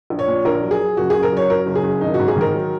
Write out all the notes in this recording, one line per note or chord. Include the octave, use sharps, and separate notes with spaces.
A#1
C#5
A#2
A#1 A#4
F#3
G#4
F#3
F#1 F#4
F#1 G#4
A#4
F#3 C#5
F#3 A#4
F#1
G#4
F#1
G#1 D#4
F#4
G#2
G#4
D#3 A#4
F#3